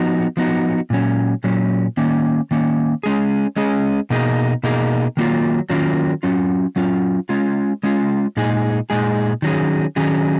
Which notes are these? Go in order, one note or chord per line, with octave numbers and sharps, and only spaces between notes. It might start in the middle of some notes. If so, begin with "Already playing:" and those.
Already playing: F3 B3 D#4 F#4
F3 B3 D#4 F#4
A#2 F#3 C#4
A#2 F#3 C#4
D#3 A#3 C#4
D#3 A#3 C#4
G#3 C#4 G#4
G#3 C#4 G#4
B2 A#3 D#4 G#4
B2 A#3 D#4 G#4
D#3 F#3 A#3 C#4 F4
D#3 F#3 A#3 C#4 F4
F#3 C#4 F4
F#3 C#4 F4
G#3 C#4 F4
G#3 C#4 F4
A#2 G#3 D#4 G#4
A#2 G#3 D#4 G#4
D#3 F#3 C#4 G#4
D#3 F#3 C#4 G#4